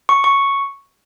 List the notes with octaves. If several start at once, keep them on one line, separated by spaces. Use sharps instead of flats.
C#6
C#6